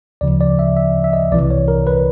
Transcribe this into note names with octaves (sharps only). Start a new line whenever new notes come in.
D2 C#3 F3 D5
D5
E5
E5
E5
D#5
C2 C3 E3 D5
C#5
A#4
B4